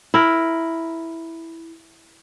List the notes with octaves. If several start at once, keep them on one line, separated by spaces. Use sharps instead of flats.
E4 A#4